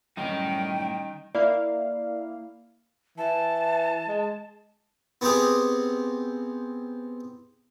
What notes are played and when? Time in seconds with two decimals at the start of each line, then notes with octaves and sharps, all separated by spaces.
0.17 F#2 A2 D#3 G3 C#4 D#4 G5
1.35 A#3 E4 D5 F5
3.18 E3 A5
4.08 G#3
5.21 B3 C4 G4 G#4